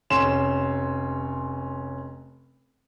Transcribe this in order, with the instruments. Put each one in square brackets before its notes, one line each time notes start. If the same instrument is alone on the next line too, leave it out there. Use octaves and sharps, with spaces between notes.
[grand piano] F1 C#4 C6 E7